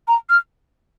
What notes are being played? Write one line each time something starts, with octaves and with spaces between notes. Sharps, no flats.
A#5
F6